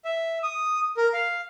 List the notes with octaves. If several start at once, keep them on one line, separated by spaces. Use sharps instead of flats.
E5
D#6
A#4
F5